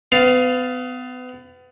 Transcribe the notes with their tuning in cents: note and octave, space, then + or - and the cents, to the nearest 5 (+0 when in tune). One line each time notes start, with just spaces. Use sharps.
B3 +35 F5 +0